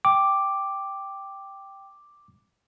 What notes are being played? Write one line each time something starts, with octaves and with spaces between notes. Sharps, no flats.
G5 D6